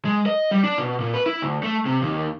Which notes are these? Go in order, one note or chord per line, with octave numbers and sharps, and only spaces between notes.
G#3
D#5
G3
D4
B2
A#2
B4
E4
D2
A3
C3
D#2